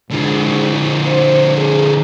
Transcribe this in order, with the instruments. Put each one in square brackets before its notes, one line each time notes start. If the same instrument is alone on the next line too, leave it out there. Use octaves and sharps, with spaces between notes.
[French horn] G#2 [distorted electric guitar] D3 F3
[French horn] C5
G#4